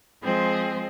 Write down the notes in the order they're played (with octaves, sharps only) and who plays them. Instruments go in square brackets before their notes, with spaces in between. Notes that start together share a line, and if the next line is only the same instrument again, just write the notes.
[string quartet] F3 G#3 C4 G#4 C5